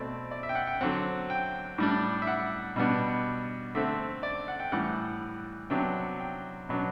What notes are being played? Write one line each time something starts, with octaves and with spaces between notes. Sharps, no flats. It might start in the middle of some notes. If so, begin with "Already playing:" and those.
Already playing: B2 A3 C4 D5
D5
E5
G5
F#5
G5
D3 F#3 C4 F#5
G5
A2 G3 D4
E5
F#5
B2 G3 B3 D4
D3 A3 C4 E5
D5
F#5
G5
A2 E3 G3 F#5
C3 F#3 B3 D4 G5
G5
B2 F#3 B3 D4